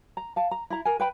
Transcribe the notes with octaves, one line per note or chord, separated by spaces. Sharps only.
A#5
F5 A5
A#5
E4 A#5
A#4 G#5
B4 G5 B5